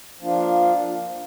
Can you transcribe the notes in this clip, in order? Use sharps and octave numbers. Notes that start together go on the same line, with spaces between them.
F3 A#3 D4 F4